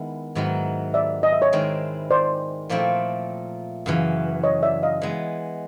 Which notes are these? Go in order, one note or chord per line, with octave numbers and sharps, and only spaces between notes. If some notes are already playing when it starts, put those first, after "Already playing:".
Already playing: D#3 G#3 B3 E4
G#2 D#3 F#3 B3 E4
D5 E5
D#5
E5
C#5 D#5
D#3 G#3 C4 E4
C5 D5
A#2 F3 A3 C4 E4
F#2 C#3 E3
C#5 D#5
D5 E5
D#5 F5
E3 G#3 B3